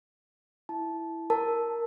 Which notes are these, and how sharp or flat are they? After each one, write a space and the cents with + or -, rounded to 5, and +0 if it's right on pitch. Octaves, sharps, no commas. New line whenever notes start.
E4 +0 A5 -15
A#4 +0 A5 +0